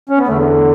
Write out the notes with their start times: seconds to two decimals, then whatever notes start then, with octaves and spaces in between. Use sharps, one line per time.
0.09 C#4
0.18 B3
0.27 E2 D3 A3